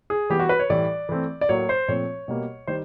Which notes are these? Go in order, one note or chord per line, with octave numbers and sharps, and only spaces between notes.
G#4
E3 G3 B3 G4
F#4
B4
C#5
A2 E3 G3 D5
E3 A3 C4
D5
A2 F#3 A#3 C#5
C5
A#2 F3 A3 C4 C#5
B2 G3 A#3
D#3 G3 C5